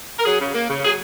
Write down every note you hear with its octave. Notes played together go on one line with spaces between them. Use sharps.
A#4
F#3 G#4
C#3
A#3
C#3
F#3 G#4